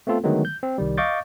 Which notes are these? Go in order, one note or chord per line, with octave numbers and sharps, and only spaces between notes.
A3 B3 C4 F4 A4
D3 D#3 F#3 G#3 A3 B3
G6
C4
C2 D#3 G3
D#5 F5 C#6 D6 G6 A6